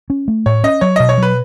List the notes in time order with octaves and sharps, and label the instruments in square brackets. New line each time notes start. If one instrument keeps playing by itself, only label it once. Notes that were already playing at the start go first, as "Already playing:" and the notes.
[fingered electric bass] C#4
A3
[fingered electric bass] A2 [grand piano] C#5
[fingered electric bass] C#4 [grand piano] D#5
[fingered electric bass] F#3 [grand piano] C#5
[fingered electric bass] B2 [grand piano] D#5
[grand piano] C#5
[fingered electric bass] F#3 [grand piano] B4